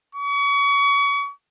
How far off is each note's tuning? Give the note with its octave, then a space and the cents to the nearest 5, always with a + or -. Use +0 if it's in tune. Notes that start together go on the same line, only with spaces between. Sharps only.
C#6 +35